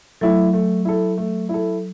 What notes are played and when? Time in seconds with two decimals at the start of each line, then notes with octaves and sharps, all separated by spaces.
0.21 F#3 A3 E4
0.53 A3
0.85 E4 A4
1.17 A3
1.49 E4 A4